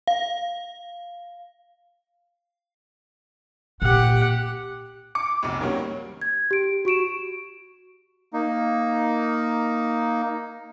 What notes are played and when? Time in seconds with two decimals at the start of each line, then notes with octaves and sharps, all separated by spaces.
0.08 F5
3.82 A#2 G4 F#5
5.15 D6 C#7
5.43 F1 B1
5.60 D#3 F#3 G3 A#3 C#4
6.22 G#6
6.51 G4 D7
6.85 F#4 C#6 D7 E7
8.33 A#3 D#4